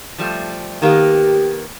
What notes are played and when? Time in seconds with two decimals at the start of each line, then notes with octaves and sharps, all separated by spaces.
0.18 F3 G3 A3
0.82 D#3 A#3 B3 G4